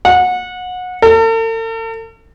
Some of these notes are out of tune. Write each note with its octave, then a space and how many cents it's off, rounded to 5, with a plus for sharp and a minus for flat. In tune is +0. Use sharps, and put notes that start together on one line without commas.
F#5 -25
A4 +45